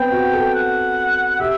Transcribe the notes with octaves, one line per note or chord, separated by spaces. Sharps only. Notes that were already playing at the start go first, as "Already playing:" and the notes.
Already playing: B3 C4 G5
F#4
A4
F#5
G4 E5